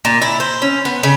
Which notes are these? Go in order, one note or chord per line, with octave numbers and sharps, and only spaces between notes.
A#2
E4
C5
C#4
B3
C#3